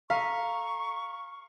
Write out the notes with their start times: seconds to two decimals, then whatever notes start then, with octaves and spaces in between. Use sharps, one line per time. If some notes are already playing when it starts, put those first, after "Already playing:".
0.10 A4 F5 A#5 C#6 B6